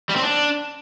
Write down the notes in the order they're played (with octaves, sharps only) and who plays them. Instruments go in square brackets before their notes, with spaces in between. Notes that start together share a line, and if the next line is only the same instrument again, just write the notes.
[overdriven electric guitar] G3
C4
D4